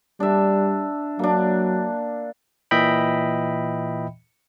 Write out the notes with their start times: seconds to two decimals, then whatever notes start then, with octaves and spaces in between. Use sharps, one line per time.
0.20 G3 D4 E5
1.19 F#3 A#3 D4
2.71 A#2 E3 D#5 E5 G5 B5